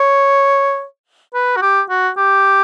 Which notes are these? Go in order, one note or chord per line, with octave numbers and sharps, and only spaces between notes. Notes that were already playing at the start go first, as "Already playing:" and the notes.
Already playing: C#5
B4
F#4
G4
F#4
G4